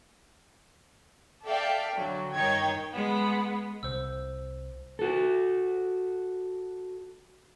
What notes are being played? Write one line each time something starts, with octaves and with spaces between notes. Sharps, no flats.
A4 D5 E5 F5 G5 A5
D3 F#3
G2 D#3 D#4 C#5 G5 G#6
G#3 B3
C2 C5 E6
F#4 A4